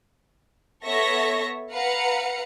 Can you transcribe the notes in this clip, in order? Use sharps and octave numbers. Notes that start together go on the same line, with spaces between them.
B3 A4 C#5 E5 C#6 A#6
B4 F5 F#5 A#5 C#7